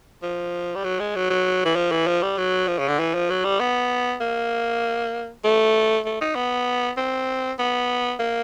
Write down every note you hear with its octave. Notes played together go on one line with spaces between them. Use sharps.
F3
G3
F#3
G#3
F#3
F#3
E3
F3
E3
F3
G3
F#3
F3
C#3
D3
E3
F3
F#3
G3
B3
A#3
A3
A3
D#4
B3
C4
B3
A#3